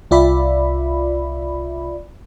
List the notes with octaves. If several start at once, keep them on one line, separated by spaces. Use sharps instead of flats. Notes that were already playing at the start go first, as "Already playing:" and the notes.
C2 F4 D5 E5 B5